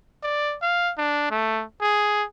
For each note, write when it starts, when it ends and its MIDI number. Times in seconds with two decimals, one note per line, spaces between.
0.23 0.56 74
0.62 0.92 77
0.98 1.26 62
1.31 1.64 57
1.81 2.24 68